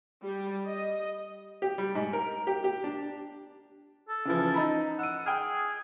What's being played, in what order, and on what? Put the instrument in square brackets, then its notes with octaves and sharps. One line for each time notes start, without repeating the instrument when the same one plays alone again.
[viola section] G3
D#5
[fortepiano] G4
G3
G#2
A#4
G4
G4
D4
[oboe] A4
[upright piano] C#3 E3 F3
D#4 A#5 B5
[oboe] F#5 [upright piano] E6 D#7
[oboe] G#4 [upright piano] G5 F6